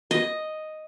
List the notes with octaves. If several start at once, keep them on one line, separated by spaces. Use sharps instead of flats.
D#5